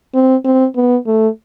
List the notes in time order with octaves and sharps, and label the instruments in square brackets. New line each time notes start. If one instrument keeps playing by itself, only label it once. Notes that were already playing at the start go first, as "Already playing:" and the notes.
[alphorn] C4
C4
B3
A3